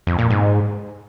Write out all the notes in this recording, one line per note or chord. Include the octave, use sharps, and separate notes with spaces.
F2
A#2
G#2